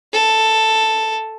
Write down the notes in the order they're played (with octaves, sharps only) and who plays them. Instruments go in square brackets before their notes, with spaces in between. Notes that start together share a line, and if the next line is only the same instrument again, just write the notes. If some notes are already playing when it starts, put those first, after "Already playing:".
[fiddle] A4